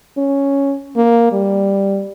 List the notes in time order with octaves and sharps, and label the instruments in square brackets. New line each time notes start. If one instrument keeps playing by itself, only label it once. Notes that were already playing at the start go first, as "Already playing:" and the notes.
[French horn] C#4
A#3
G3